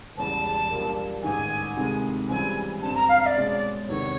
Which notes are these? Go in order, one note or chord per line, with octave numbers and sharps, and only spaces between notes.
E1 E2 C#3 E3 G3 A5
A#1 A#2 G3 A#3
A1 G#2 D#3 G#5
D2 C3 D#3 G#3
C#2 C#3 E3 G3 C4 G#5
G2 D3 G3 C4 A5
A#5
F5
F5
D5
B2 G#3 C#4
E2 C3 D#3 C#5